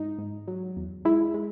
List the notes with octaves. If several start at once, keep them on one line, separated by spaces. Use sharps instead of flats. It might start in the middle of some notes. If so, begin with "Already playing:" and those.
Already playing: G#2 D#4
G#2
F#3
E2
G#3 E4
G#3